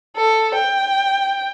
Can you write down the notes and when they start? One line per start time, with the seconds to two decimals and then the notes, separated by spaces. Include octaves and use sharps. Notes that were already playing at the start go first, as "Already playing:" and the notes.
0.17 A4
0.55 G5